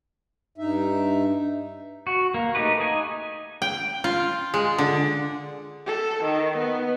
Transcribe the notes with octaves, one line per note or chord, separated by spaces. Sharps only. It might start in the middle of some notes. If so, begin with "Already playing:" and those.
G2 D#4 E5
F#4
A#3
A3 D#4 G4 B4
D#4 G#5
G5
F4
G#3
D3
A4
D#3
B3